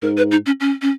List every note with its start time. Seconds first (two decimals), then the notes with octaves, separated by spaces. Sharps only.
0.02 G#2 A#4
0.17 B4
0.31 D#4
0.46 C#4
0.60 C#4
0.82 C#4